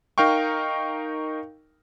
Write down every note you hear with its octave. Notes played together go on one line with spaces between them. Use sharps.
D#4 A#4 F5 G5 C#6